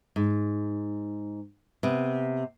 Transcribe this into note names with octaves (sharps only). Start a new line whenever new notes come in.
G#2
C3 B3